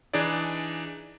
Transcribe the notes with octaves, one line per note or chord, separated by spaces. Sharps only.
E3 D4 D#4 G#4 D5